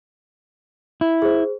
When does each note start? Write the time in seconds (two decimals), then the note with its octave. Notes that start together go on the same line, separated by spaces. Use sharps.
1.01 E4
1.22 G#4 C5